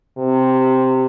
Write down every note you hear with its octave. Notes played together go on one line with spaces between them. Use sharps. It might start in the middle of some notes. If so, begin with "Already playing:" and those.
C3